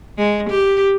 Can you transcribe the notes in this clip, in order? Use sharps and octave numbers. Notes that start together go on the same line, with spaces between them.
G#3
G4